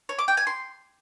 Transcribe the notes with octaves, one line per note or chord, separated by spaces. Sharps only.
C#5
D6
G5
G#5
C6